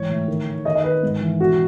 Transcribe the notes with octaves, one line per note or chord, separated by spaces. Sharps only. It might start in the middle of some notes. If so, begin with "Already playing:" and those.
Already playing: G#2 E3 C#5
A2
D#3
D#3
D#3 D#5
D#5
D#3 B4
G#2
E3
B2 F#4